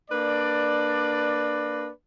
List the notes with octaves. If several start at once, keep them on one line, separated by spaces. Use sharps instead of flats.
A#3 D4 B4 D5